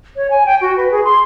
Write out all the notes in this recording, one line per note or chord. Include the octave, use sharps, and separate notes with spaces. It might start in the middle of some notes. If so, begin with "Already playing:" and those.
C#5
G#5
G5
F#4
B4
G#4
C6